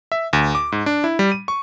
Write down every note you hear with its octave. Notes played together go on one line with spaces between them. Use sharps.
E5
D2
D6
G#2
D4
E4
G3
D#7
C#6